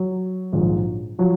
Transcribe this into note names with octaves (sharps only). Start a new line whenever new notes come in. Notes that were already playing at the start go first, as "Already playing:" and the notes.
Already playing: F#3
A#1 G#2 D#3
F3 F#3